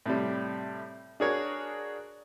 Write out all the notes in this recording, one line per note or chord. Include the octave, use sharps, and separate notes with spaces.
A2 C3 G3
D4 F#4 G#4 A#4 C#5